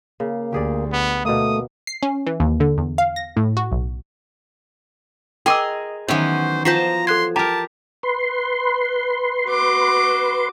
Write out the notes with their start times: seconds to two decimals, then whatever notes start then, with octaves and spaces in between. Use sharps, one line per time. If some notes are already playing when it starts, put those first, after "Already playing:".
0.20 C#3 A#3
0.53 D2 G4 G#4 D5
0.92 B3
1.25 B2 A3 A#3 D#6
1.87 C7
2.03 C#4
2.27 E3
2.40 D#2
2.60 D3
2.78 E2
2.98 F5
3.16 A#6
3.37 A2
3.57 F#4
3.72 B1
5.46 G#4 A#4 D#5 G5 C6 D6 E6
6.08 D#3 E3 F#3 B3 C#4 C5
6.65 F3 C5 A5 A#5 G6 B6 C7
7.07 A4 C6 F#6 G#6
7.36 G4 A#4 A5 A#5
8.03 B4 C6
9.48 F#4 D6